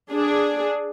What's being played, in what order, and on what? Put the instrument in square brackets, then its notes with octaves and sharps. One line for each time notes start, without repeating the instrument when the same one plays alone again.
[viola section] D4 G#4